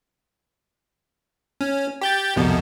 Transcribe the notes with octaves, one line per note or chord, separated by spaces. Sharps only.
C#4
G4 G6 A6
C2 F2 B2